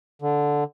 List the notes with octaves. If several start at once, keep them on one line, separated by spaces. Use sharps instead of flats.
D3